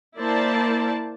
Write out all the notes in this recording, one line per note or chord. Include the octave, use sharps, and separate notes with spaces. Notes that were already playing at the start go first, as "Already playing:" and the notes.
A#3 E4 C5 D5 A5